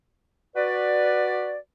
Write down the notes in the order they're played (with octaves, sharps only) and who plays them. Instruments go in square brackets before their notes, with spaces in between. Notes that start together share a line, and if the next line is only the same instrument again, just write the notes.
[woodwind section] F#4 B4 D5